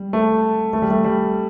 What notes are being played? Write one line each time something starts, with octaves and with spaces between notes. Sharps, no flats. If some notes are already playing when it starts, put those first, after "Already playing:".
Already playing: G3
A3
A3
G3
A3
G3